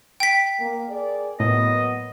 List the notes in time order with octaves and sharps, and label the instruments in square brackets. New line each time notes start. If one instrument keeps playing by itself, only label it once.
[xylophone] G5 B6
[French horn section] A#3
G#4 A#4 D5
[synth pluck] A2 [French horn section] F#3 A#3 B3 [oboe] D#5